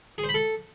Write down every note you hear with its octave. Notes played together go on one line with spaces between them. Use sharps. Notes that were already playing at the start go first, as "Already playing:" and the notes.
G#4
C5
B5
A4